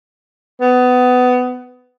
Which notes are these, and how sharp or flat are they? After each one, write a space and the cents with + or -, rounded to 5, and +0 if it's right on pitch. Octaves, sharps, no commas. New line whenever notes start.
B3 +20